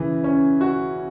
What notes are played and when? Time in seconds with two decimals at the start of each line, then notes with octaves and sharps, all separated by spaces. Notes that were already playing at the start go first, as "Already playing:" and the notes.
Already playing: C#3 E3
0.24 C#4
0.61 F#4